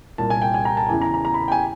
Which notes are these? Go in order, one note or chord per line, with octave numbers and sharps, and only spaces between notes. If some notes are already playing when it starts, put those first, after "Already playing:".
C2 A#2 A5
G#5
G5
G#5
A#5
A5
E2 C#3 E3 G#5
A#5
A#5
A#5
B5
G5
G#5